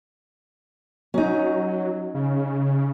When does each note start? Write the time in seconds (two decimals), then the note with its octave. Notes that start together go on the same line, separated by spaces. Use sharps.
1.14 F#3 C#4 D#4
2.14 C#3